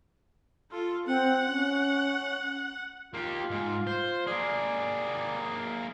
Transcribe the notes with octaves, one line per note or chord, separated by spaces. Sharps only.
F4 A4
C4 F#5
C#4
A#3 F4 G4
G#2
C5
A#3 G#4 D5